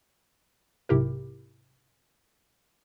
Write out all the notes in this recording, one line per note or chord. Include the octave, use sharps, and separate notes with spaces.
B1 G#2 C3 E4 G4 A#4